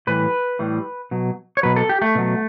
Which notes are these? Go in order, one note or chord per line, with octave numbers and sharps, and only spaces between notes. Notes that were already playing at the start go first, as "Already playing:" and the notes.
A2 E3 G3 B4
A2 E3 G3
B2 F#3
C#5
B2 F#3 B4
A4
G4
A3
B2 F#3